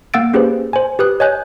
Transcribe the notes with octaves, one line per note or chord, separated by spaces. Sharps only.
A#3 F5 F#5 E6 A6 D7
A#3 C#4 G4 G#4 B4 C5
C5 G#5
G4 B4 D#6 F#6
C#5 D#5 G#5 F#6 G6